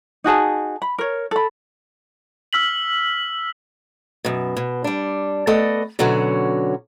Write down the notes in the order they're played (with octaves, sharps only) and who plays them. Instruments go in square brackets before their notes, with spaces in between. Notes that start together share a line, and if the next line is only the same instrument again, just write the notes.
[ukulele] D#4 F#4 G#4 A5
B5
A#4 C#5
A4 B5
[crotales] E6 F6 B6 F#7
[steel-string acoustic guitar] F#2 B2
B2
G3 D4
A3 B3 A4 D5 D#5
B2 D3 F#3 C#4 F#4